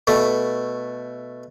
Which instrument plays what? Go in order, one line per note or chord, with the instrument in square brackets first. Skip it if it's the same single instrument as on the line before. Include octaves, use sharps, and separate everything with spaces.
[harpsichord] B2 A3